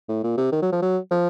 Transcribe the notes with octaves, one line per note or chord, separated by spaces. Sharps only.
A2
A#2
C3
D#3
F#3
F3
F#3
F3